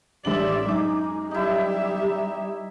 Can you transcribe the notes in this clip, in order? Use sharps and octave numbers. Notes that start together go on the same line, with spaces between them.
A1 D4 G4 D5 E5 F#7
F#2 G#3 D#4 D6
G3 D#4 E4 G4 E5